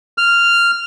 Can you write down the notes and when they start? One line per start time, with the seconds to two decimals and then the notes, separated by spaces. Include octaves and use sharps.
0.18 F6